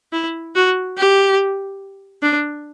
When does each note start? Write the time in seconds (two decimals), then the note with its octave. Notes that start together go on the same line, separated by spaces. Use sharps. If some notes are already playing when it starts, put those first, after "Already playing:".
0.13 E4
0.55 F#4
0.97 G4
2.22 D4